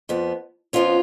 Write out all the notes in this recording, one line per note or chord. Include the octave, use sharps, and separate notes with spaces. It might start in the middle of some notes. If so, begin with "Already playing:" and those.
F2 F3 B3
F2 F3 B3 C#4 F4